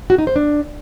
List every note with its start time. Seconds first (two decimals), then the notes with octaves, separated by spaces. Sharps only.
0.10 F#4
0.18 D#4
0.27 C5
0.36 D4